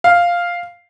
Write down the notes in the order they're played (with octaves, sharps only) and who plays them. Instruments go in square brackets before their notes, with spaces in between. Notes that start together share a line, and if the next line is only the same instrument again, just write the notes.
[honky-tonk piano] F5